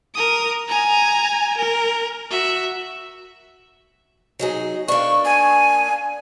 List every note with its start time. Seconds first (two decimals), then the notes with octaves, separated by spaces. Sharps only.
0.14 A#4 D#6
0.68 G#5 A#5
1.58 A#4
2.31 F#4 E5
4.39 F#3 D#4 G#4
4.88 A#3 D4 C#6
5.25 G#5